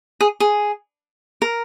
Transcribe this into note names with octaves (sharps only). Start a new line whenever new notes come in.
G#4
G#4
A#4